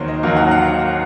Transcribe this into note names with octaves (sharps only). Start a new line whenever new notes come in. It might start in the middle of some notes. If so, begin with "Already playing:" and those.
Already playing: D#2 D#3 F#3 A#3 C5 C#5
D#5
D#2 D#3 F#3 A#3 F5
F#5
F#5